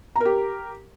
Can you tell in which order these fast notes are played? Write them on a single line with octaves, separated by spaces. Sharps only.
A#5 A#4 G4